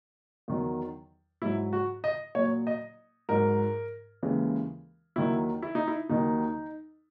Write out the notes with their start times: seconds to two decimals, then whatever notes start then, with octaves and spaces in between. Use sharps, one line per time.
0.48 E2 D#3 F#3
1.42 G#2 F#3 E4
1.73 F#4
2.04 D#5
2.35 A#2 F#3 C#5
2.67 D#5
3.29 G#2 F#3 A#4
4.23 D#2 C#3 E3 G#3
5.16 D#2 D#3 F#3 E4
5.62 E4
5.75 D#4
5.88 E4
6.09 D#2 D#3 F#3 D#4